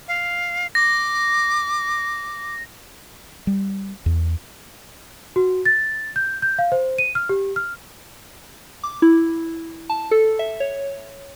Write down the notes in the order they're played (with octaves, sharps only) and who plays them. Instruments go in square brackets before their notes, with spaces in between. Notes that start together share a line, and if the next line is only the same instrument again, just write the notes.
[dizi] F5
[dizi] D6 [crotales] A#6
[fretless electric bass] G3
E2
[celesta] F#4
A6
G6
G6
F5
C5
D#7
F6
G4
F6
[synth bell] D6
E4
A5
A4
E5
C#5